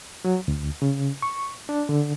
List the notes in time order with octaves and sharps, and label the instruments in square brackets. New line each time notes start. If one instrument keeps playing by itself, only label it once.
[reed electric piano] F#3
D2
C#3
C#6
D4
D3